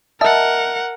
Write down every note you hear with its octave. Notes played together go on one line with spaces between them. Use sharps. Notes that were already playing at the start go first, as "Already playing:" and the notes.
A#4 D#5 E5 F#5 A5